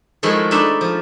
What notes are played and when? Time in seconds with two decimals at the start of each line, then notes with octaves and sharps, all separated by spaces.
0.23 D#3 F3 G#3 A3 E4
0.51 D4 D#4 E5 A5 B5
0.81 F3